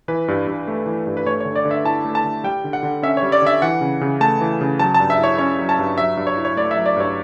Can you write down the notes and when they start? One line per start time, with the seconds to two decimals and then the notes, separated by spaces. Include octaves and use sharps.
0.08 E3 B4
0.28 G2
0.47 G2
0.68 A3
0.86 E3
1.07 G2
1.17 B4
1.26 A3 C#5
1.40 C#5
1.45 D3
1.56 D5
1.65 D3
1.71 E5
1.84 E4 A5
2.05 A3
2.15 A5
2.24 D3
2.44 G3 G5
2.64 D3
2.73 F#5
2.83 D3
3.03 C#4 E5
3.17 C#5
3.23 G3
3.32 D5
3.42 D3 E5
3.62 E3 F#5
3.81 C#3
4.01 C#3
4.20 A3 A5
4.41 E3
4.61 C#3
4.79 F#3 A5
4.94 A5
5.00 G2
5.10 E5
5.19 E4 C#5
5.38 C#4 C#5
5.59 F#3
5.69 A5
5.79 G2
5.98 F#3 E5
6.17 G2
6.27 C#5
6.37 E4
6.45 C#5
6.56 A3 D5
6.71 E5
6.76 F#3
6.86 D5
6.96 G2 C#5